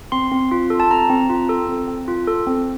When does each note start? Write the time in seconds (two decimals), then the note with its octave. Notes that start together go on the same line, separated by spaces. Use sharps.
0.12 C4 C6
0.32 C4
0.51 F4
0.70 A4
0.80 A5
0.90 C4 A#5
1.10 C4
1.29 F4
1.49 A4
1.69 C4
1.88 C4
2.08 F4
2.27 A4
2.47 C4